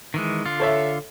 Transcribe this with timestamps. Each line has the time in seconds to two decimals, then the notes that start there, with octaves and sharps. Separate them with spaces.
0.14 D#3 E3 G#3
0.45 D3 F4
0.60 A4 C#5 E5